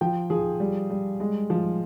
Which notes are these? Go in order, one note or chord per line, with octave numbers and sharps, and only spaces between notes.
F3 G5
F3 G#4
G3
G3
G#3
F3